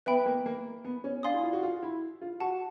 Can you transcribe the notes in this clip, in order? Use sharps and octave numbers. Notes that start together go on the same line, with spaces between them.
B3 B4 E5 G5 B5
A#3
A#3
B3
C#4
D4 D5 F5 G#5 C6 D#6
E4
F4
F#4
F4
E4
F4
F#4 F#5 A5 C#6